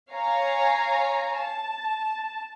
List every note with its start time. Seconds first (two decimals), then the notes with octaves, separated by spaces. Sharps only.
0.11 C#5 F5 G#5 A#5
1.38 A5